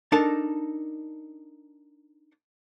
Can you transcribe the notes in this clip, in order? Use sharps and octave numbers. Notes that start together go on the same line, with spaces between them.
D4 D#4 A4 A#4 A5